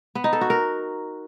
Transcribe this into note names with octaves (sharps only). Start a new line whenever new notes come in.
B3
D#4
A4
F#4
A#4